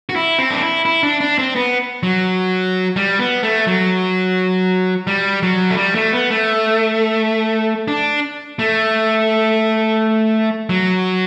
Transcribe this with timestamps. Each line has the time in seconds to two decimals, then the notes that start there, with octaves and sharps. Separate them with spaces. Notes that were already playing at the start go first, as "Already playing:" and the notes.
0.09 F#4
0.16 E4
0.39 C4
0.50 D4
0.62 E4
0.85 E4
1.03 D4
1.21 D4
1.39 C4
1.56 B3
2.03 F#3
2.96 G3
3.19 B3
3.43 A3
3.67 F#3
5.07 G3
5.43 F#3
5.71 A3
5.77 G3
5.95 A3
6.13 B3
6.30 A3
7.88 D4
8.59 A3
10.69 F#3